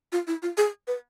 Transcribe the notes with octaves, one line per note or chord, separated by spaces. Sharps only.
F4
E4
F4
G#4
B4